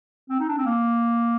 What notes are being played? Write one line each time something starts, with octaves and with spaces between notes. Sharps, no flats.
C4
D#4
D4
C4
A#3